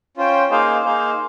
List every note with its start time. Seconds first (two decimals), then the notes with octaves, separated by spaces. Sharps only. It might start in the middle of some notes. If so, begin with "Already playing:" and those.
0.17 C#4 F4 C5 G5
0.50 A#3 D#4 G#4 C5 F5
0.84 A#3 D#4 G#4 C5 F5